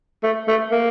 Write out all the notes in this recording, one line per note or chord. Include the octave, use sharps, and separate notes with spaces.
A3
A3
A#3